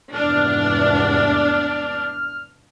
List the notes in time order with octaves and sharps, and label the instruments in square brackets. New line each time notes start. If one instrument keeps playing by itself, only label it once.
[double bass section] F1 E2 G#2 [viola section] D4 [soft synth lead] F6